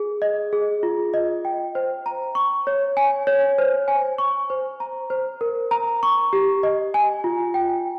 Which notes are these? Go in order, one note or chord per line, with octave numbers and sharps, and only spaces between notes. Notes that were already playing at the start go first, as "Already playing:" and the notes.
Already playing: G#4
D#5
G#4
F4
D#5
G5
C5
A#5
C#6
C#5
G#5
C#5
C5
G#5
C#6
C5
A#5
C5
A#4
A#5
C#6
G4
D#5
G#5
F4
G5